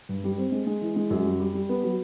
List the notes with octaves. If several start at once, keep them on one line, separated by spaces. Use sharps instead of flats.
G2
G3
C4
G#3
G#3
E3
G#3
F#2
G3
G3
G3
B3
F#3